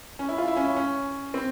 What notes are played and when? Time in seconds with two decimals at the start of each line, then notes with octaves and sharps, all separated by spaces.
0.19 C#4
0.29 E4
0.38 F4
0.48 E4
0.57 C#4
0.65 E4
0.76 C#4
1.34 C4